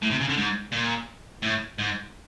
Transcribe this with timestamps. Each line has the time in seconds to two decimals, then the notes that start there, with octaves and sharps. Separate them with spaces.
0.02 A2
0.11 C3
0.20 C#3
0.29 D3
0.37 G#2
0.72 A#2
1.42 A2
1.78 G#2